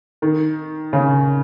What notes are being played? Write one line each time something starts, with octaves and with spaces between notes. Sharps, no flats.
D#3
C#3